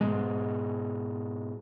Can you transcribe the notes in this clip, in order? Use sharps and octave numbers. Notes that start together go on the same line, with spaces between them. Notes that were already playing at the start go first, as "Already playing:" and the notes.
G#2 B2 G#3